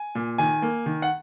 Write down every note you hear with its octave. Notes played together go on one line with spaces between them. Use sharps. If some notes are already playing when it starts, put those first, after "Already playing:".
Already playing: G#5
A#2
D#3 G#5
A#3
D#3
F#5